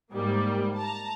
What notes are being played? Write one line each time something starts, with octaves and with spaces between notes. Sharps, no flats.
G#2 G3 A#3
A5 A#5